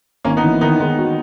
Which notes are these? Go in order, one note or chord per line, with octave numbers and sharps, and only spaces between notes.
G#1 A#3 C#4
B3 D#4
E3
D#3 B3 D#4
D#3 G#3 B3
F#4